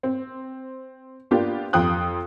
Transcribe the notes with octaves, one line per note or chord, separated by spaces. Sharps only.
C4
A#3 B3 D4 F4 G4
F2 F4 G5 D#6 F#6